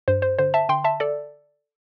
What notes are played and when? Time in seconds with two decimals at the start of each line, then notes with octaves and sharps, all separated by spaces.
0.08 G2 C5
0.22 C5
0.38 D3 C5
0.54 E5 A5
0.69 D3 G5 C6
0.84 E5 A5
1.00 A4 D5